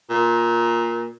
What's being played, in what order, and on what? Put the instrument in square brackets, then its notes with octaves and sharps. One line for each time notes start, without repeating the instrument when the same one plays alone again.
[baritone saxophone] A#2